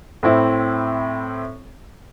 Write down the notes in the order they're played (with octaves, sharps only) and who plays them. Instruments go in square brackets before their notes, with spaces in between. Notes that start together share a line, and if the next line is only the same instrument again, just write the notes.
[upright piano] A2 C4 E4